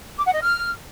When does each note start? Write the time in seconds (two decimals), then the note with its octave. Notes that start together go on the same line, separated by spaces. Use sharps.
0.17 D6
0.25 F#5
0.33 D#5
0.41 F6